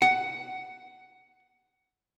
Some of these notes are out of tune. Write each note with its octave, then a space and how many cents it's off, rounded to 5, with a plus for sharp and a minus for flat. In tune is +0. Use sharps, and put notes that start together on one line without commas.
F#5 +10